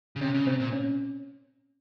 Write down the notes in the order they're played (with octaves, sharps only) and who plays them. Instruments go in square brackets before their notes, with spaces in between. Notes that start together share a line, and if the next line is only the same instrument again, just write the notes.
[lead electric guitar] C#3
[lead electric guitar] C3 [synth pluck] C#4
[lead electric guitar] C#3
[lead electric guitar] C3 [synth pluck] C4
[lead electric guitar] A#2
[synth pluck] C#4